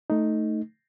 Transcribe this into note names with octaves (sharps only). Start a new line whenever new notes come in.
A3 D#4